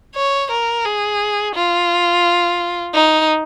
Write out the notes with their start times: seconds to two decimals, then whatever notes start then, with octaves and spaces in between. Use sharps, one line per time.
0.15 C#5
0.51 A#4
0.85 G#4
1.55 F4
2.94 D#4